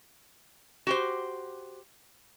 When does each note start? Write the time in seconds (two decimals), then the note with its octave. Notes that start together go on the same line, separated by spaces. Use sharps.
0.87 F#4 G4 C5